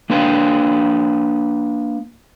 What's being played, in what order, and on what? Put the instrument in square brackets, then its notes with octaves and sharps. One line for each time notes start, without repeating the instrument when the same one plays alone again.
[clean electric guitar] A#3 D4 B4 F5 G5